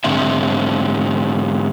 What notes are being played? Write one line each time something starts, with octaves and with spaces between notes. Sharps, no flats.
G#2 D3 C4 D4 E5